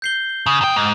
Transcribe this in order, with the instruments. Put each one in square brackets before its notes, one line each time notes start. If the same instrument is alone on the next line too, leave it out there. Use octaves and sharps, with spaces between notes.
[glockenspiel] G6 C7 G7
[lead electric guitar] C#3 [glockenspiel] D#6
[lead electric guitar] F#2 G5
G#2